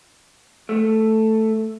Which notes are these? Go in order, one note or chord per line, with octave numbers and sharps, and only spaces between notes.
A3